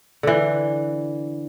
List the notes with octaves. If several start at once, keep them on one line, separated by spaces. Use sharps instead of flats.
D3 E3